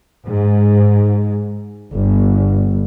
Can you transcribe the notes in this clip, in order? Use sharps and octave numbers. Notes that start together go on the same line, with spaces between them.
G#2
G1